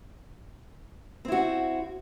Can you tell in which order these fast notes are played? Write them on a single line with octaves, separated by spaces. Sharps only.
C4 E4 F#4